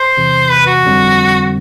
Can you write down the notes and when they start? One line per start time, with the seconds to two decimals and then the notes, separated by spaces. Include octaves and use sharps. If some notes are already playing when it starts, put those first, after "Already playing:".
Already playing: C5
0.17 E2 C3 E3
0.51 B4
0.67 F#4
0.84 G1 F2 D3 G3 C4